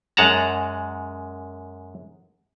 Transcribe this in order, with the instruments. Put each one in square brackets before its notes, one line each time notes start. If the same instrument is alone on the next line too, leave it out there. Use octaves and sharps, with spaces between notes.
[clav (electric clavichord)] F#2 G#3 F#5 A5 A#5